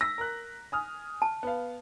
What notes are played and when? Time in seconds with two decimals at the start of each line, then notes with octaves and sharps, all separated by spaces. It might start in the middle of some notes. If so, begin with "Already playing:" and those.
0.01 E6 A#6 B6
0.18 A#4 F#6
0.72 G#5 D#6 F6
1.22 A5
1.43 B3 F5